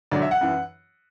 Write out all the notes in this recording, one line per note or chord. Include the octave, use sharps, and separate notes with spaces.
D2 D3 F#3 D5
E5
F#5
F#2 E3